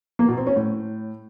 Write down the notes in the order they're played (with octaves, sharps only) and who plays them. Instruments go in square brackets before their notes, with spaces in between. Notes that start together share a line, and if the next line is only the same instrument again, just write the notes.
[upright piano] A#3
B2
C4
C#4
A2